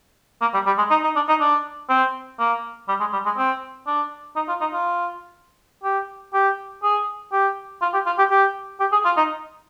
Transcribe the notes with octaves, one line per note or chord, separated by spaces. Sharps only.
A#3
G3
G3
G#3
D#4
D#4
D4
D#4
D4
C4
A#3
G3
G#3
G3
G#3
C4
D4
D#4
F4
D#4
F4
G4
G4
G#4
G4
F4
G4
F4
G4
G4
G4
G#4
F4
D#4